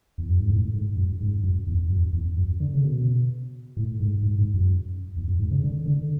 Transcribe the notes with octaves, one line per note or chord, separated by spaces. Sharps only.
E2
F#2
G#2
A2
G#2
F#2
G#2
F#2
E2
F#2
E2
F#2
D3
C#3
B2
A2
G#2
G#2
G#2
F#2
E2
F#2
G#2
C#3
D3
D3